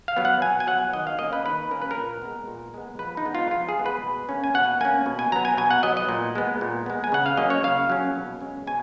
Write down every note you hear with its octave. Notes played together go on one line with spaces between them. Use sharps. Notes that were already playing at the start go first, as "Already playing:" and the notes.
F5
F#3 B3
F#5
B2 G#5
G#5
F#3 B3 F#5
D#3 D#5
F5
A#3 C#4 D#5
B4
D#3 B4
A#3 C#4 A#4
B4
A#4
A#2
G#3 B3
A#2
G#3 B3
F3 B4
D#4
G#3 B3
F4
F3 F4
G#4
G#3 B3
B4
B2
A#3 C#4
G#5
B2 F#5
A#3 C#4 G#5
B2
G#5
F#3 B3 A#5
G#5
B2 G#5
F#5
F#3 B3 D#5
D#5
A#2
G#3 B3
A#2
G#3 B3
G#5
C#3 F#5
F5
F#3 A#3 C#4 D#5
C#5
C#3 F5
F#3 A#3 C#4
B2
G#3 C#4
B2 G#5